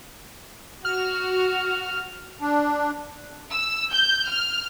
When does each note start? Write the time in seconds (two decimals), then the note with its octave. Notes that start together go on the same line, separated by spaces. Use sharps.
0.85 F#4 F6
2.41 D4
3.52 E6
3.91 G6
4.28 F6